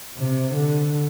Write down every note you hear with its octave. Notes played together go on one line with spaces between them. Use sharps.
C3
D3